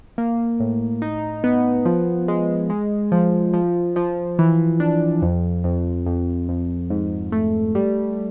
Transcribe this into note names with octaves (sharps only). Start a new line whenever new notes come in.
A#3
A2
D#4
B3
F3
G#3
G#3
F3
F3
F3
E3
D4
F2
F2
F2
F2
G#2
A3
G3